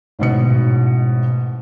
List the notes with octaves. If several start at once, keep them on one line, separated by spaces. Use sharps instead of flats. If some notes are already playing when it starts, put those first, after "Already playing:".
A1 G#2 B2 C#7